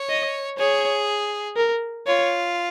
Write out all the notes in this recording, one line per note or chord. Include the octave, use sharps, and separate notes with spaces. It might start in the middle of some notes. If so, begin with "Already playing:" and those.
Already playing: C#5
D#5
G#4 C#5
A#4
F4 C#5